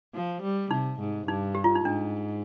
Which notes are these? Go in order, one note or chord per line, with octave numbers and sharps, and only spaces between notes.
F3
G3
C3 D#4
G#2
G2 D#4
G4
F4
D#4
G#2 D4